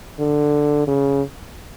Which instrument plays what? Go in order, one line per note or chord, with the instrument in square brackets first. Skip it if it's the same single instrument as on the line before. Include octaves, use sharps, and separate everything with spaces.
[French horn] D3
C#3